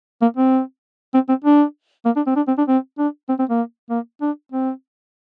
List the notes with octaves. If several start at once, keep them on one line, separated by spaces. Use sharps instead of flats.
A#3
C4
C4
C4
D4
A#3
D4
C4
D4
C4
D4
C4
D4
C4
C4
A#3
A#3
D4
C4